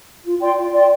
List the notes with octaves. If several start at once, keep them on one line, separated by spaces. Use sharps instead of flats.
F4
D5 G5 C6
F4
D5 G5 C6